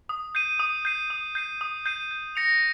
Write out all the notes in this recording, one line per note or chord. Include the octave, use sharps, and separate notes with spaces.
D#6
G6 C7 D#7
D#6
G6 C7 D#7
D#6
G6 C7 D#7
D#6
G6 C7 D#7
G6
A#6 C#7 F7